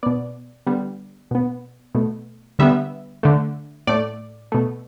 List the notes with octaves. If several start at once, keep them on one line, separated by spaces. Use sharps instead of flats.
B2 B3 D5
D3 G3 B3
B2 B3
B2 A3
D3 G3 B3 E5
D3 A3
A2 A3 D5
B2 A3